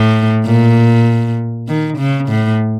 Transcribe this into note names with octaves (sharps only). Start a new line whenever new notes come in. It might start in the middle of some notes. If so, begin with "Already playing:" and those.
Already playing: A2
A#2
D#3
C#3
A2